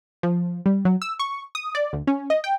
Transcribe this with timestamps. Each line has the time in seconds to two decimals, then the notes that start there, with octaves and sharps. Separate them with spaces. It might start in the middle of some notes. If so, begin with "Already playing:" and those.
0.23 F3
0.66 G3
0.85 F#3
1.02 E6
1.19 C#6
1.55 D#6
1.75 D5
1.93 D2
2.07 C#4
2.30 D#5
2.44 G5